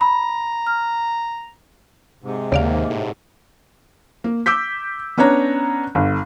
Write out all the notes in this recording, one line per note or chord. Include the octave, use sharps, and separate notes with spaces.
A#5 B5
F6
G#2 C3
D#2 C#3 A#3 D5 F5
A2
A#3
D6 E6 G6 B6
B3 C#4 D4 C#5 A#5
G1